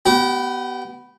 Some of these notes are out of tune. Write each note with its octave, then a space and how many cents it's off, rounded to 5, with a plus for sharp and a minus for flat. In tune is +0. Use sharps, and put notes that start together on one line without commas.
B3 +0 G4 -30